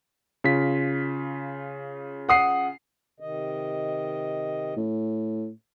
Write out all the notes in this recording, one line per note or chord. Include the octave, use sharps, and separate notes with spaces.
C#3 F4 B6
F#5 D#6 C7
C3 D#3 D#5
A2